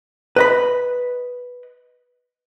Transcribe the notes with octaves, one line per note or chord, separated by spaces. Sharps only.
B4 D#5 B5